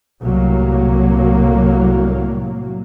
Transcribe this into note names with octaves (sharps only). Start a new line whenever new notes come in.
C2 A2 F#3 A#3